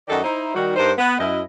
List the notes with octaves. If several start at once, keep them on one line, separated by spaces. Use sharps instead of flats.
F#2 D#3 F#4 A4 D5 D#5
D#4 E4 C5
D#3 G3 F#4
G2 D#4 A#4 C5
B3
F#2 E4 D#5